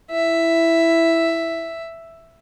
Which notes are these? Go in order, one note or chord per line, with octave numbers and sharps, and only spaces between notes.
E4 E5